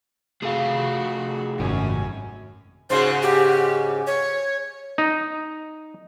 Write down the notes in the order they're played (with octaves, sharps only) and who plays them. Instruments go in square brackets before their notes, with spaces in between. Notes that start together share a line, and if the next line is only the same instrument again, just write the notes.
[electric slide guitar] C3 A3 [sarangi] F#4 [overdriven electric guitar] G#4 F5
[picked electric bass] G#1 [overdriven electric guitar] F#2 [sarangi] C#4
[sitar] G#2 C#3 F#4 [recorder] C5
[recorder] G4
C#5
[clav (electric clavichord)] D#4